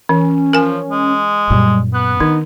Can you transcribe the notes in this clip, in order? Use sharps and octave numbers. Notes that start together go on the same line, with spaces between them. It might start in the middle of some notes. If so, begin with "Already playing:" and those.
E3 C#4
F3 A#4 G#5
G#3
F#2 A#2 G3
B3 F#6
D#3 D4 D#4